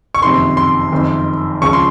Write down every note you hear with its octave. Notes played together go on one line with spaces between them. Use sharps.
C#6
F#1 F2 C3 D#3 C6
C6
F#1 F2 D#3
C#2 C#3 F3 C#6
C6